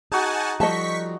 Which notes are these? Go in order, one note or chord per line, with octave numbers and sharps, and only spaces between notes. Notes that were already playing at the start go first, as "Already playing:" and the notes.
D#4 F#4 G#4 F#5 G#5 A5
F3 G3 A4 D#5 A5 C#6 B6